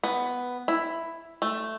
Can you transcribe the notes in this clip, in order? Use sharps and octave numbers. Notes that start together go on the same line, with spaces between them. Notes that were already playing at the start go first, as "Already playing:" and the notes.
B3
E4
A3